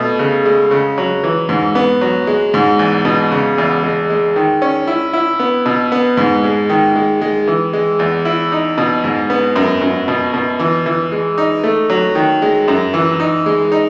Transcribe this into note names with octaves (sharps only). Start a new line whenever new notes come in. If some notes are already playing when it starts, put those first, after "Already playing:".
Already playing: B2 A3
C#3
G#3
C#3
F#3
E3
G#2
B3
F#3
G#3
G#2
E2
B2
C#3
E2
G#3
G#3
D#3
C#4
E4
E4
B3
B2
B3
G#2
G#3
D#3
G#3
G#3
E3
G#3
E2
E4
D#4
B2
G#2
B3
F#2
F#2
B2
B2
E3
E3
G#3
D#4
A3
F#3
D#3
G#3
F#2
E3
D#4
G#3
D#4